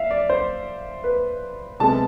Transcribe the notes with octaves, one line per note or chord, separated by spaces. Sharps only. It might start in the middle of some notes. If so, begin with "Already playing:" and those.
Already playing: E5 F5
D5
C5
B4
C3 G#3 B3 A5